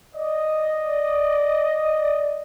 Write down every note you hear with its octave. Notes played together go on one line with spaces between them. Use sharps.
D5 D#5